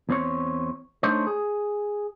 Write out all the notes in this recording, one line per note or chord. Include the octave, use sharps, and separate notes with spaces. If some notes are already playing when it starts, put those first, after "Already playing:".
E2 C4 C#5
A3 D4 D#4 C5 C#5
G#4